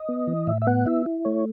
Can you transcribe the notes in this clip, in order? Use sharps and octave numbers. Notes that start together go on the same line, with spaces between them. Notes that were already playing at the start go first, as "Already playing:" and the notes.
Already playing: D#5
B3
E3
A2 E5
E5
B3 F#5
E4 E5
E4
A3 C#5